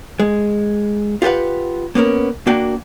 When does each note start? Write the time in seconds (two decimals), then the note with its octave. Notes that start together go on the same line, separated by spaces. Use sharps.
0.20 G#3
1.22 F4 G4 A4 B4 F#5
1.95 A#3 B3 C#4 A#4
2.47 A#3 D4 F#4 G5